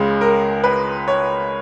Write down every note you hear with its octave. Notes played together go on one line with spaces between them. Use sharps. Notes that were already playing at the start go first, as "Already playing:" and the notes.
Already playing: C#2 C#3 G#3
A#4
B4
C#5